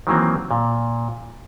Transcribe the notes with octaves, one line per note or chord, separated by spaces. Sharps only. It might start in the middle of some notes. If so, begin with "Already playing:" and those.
D#3 E3 F#3 A#3 C4
A#2